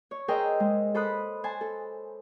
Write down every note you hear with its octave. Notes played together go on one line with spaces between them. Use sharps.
C#5
G#4 A#4 C5 D#5 G5 E6
G#3
A4 C5 B5 D#6 F#6
C5 G#5 A5
A4